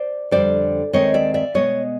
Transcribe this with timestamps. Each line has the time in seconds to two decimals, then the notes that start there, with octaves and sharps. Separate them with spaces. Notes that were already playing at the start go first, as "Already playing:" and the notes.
Already playing: C5 D5
0.31 F2 D3 G3 C5 D5
0.93 D#2 D#3 G#3 C4 C#5 D#5
1.14 D5 E5
1.34 D5 E5
1.54 B2 G#3 B3 C#5 D#5